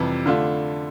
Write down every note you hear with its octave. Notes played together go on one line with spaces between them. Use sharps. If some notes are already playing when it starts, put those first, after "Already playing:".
Already playing: F2 C3 E3 G3
D3 A3 D4 F4